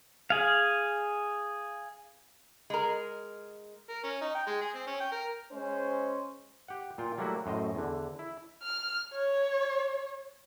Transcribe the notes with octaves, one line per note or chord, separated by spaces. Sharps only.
G#4 F5
G#3 A#4
A#4
C#4
D#4
G5
G#3
G#4
C4
C#4
G5
A#4
G#3 C#4 C5
G4 F#5
A#2 F4 G5
F#3 G3 A3 A#3 E4 F#4
F#2 A2 C5 D#5
E2 D3
E4
F6
C#5